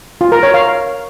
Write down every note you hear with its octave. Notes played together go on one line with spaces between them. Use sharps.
F4
A#4
C#5
F5